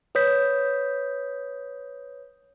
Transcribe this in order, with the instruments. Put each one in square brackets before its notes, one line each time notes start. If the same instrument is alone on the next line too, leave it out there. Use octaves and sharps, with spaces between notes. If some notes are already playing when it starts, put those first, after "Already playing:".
[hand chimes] B4 C#5 D#6 G6 B6